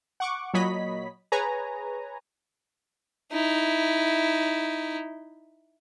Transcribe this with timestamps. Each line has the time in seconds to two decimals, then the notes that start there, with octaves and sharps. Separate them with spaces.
0.20 F#5 C#6 D6
0.53 A#2 F#3 C#5 D#5 B5 B6
1.32 G#4 B4 C#5 G#5 A#5
3.32 D#4 E4